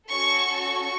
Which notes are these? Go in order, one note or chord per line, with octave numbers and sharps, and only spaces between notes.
C#4 F#4 A4 C#6
C#6